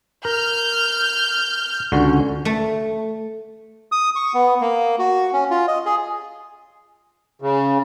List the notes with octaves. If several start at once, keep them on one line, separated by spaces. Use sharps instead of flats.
A#4 F6 G6
C#2 D3 F#4
A3
D#6
C#6
B3
A#3
F#4
C#4
F4
D#5
G#4
C#3